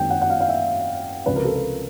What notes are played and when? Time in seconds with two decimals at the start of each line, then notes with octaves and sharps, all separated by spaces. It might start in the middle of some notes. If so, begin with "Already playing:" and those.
Already playing: F#2 D#3 G#3 C4 G5
0.10 F#5
0.21 F#5
0.30 F5
0.41 F5
0.49 E5
1.26 C#2 C3 F3 B4
1.36 A#4
1.45 A4
1.54 A#4